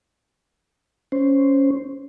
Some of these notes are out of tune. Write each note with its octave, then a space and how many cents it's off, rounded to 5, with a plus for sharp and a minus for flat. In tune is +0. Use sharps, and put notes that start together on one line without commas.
C#4 +0 C5 +0